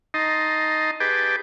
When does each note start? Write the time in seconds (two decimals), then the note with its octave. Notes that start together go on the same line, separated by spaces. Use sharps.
0.14 D#4 D#5 A5 A#5 C6
1.00 G4 G#4 B4 G5 A5 D6